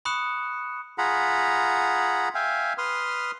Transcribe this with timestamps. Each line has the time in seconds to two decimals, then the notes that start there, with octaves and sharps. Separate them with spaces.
0.05 B5 C#6 D#6 F#6 C#7 E7
0.98 F4 G#4 F#5 A#5 B5
2.35 E5 F5 G5 G#5
2.78 B4 C6 D#6 F6